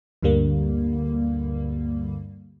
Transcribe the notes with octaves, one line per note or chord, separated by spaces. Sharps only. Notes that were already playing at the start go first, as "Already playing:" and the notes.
D2 G2 D3 G3 A#3